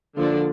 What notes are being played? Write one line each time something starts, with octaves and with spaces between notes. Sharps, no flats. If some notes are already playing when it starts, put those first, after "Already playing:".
D3 F3 A#3 D4 F4